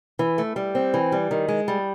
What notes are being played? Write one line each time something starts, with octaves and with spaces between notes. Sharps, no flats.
E3
A3
G3
C4
E3
G3
D#3
G#3
G3